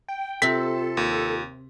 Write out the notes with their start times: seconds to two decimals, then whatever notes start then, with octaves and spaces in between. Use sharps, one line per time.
0.08 G5
0.42 C3 C4 F4 A4 B6
0.97 D#2